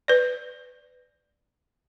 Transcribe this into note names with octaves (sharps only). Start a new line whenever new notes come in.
B4 D5